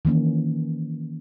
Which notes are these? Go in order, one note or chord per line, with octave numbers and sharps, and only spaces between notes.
D#3 E3 A#3 C#4